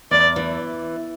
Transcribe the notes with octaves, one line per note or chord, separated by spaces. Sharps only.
E2 D5
E3